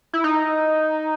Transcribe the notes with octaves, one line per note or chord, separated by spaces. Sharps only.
E4
D#4